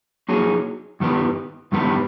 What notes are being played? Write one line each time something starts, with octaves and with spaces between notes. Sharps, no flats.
F#3 A#3 D#4 G#4
G2 D#3 G3 B3
G2 D#3 G3 B3